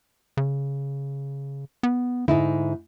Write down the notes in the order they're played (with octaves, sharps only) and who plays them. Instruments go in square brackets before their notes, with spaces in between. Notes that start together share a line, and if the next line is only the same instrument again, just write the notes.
[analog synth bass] C#3
B3
[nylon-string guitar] G#2 D#4 E4 [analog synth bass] D3